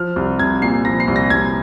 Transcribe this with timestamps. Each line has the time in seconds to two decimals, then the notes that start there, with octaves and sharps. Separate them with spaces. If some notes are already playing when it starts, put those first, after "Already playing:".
Already playing: F3 F6
0.16 C2
0.39 C2 G#6
0.62 A#2 C7
0.85 F3 A#6
1.00 C7
1.08 C2
1.16 A#6
1.30 C2 G#6